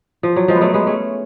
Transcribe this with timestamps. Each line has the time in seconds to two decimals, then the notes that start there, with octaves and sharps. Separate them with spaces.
0.23 F3
0.36 F#3
0.48 F3 G#3
0.55 B3
0.61 F#3 A3
0.74 G#3 B3
0.87 A3 C#4